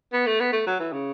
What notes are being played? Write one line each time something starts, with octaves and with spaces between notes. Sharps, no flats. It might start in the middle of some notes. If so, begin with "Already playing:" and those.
B3
A3
B3
A3
F#3
E3
C#3